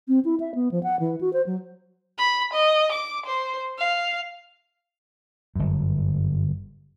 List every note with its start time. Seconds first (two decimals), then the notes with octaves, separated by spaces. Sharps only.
0.08 C4
0.25 E4
0.40 E5
0.55 B3
0.71 F3
0.83 F#5
1.00 E3
1.21 F#4
1.33 C5
1.46 F#3
2.18 B5
2.53 D#5
2.92 D6
3.26 C5
3.78 F5
5.55 G1 F#2